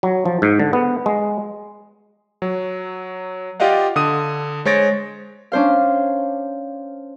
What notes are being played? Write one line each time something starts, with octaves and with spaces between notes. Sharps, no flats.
F#3
F3
G#2
D3
B3
G#3
F#3
F4 G4 D5 D#5 F5 F#5
D3 D#6 D#7
G#3 C5 C#5 A6 A#6 D7
C#4 D4 C5 F5